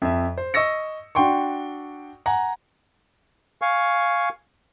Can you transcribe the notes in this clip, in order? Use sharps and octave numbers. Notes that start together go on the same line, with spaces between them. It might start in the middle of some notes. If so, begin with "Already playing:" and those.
F2 E5
C5
D#5 C#6 E6 A#6 C#7
D4 F#4 F#5 G5 C6 C#6
F#5 G#5 A#5
F5 G#5 C#6